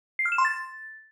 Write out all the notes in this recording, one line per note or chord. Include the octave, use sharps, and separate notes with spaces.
C7
F6
E7
C6
A6